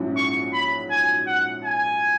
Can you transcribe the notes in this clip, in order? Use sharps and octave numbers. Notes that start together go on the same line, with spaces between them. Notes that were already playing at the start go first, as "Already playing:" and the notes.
Already playing: A#1 G#2 F#3 C#4 E4
C#6
B5
G#5
F#5
G#5